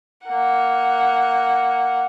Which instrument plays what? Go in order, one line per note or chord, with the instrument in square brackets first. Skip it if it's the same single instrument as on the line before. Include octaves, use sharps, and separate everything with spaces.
[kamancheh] A#3 F#5